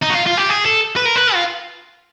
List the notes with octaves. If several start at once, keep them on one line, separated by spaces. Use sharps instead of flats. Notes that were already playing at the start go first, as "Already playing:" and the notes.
D#4
F#4
F4
F4
G4
G#4
A4
B4
A#4
B4
F4